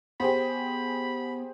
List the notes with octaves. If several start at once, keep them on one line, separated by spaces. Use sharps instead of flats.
B3 G4 G#4 C5 B5